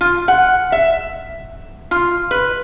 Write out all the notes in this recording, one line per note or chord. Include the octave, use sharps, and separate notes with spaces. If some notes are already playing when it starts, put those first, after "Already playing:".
F4
F#5
E5
F4
B4